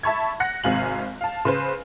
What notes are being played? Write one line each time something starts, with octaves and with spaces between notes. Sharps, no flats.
E5 A5 B5 C#6 G#6
F#5 F#6 A#6 C#7
G#1 C3 F5 G#5 F#7
F5 A5
C#3 B4 C5